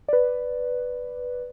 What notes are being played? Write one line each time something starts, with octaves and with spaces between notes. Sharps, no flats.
B4 D5